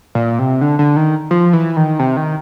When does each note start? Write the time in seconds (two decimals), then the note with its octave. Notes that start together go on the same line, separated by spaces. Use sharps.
0.15 A#2
0.39 C3
0.61 D3
0.79 D3
0.96 D#3
1.31 F3
1.53 E3
1.77 D#3
1.99 C3
2.17 D#3